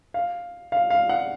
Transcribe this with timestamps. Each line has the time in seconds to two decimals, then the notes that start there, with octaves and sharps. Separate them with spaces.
0.14 F5
0.72 F5
0.90 F5
1.09 F#5